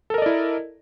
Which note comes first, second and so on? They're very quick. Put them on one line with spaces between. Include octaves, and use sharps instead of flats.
A4 A#4 D#5 D5 E4